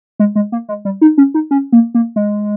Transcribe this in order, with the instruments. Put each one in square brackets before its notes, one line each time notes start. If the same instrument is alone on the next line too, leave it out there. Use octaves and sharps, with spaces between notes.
[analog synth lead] G#3
G#3
A#3
G#3
G3
D#4
C#4
D#4
C#4
A#3
A#3
G#3